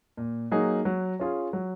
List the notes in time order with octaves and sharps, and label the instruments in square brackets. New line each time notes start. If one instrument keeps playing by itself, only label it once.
[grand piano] A#2
F#3 A#3 D#4 G#4
F#3
C#4 F4 G#4
F#3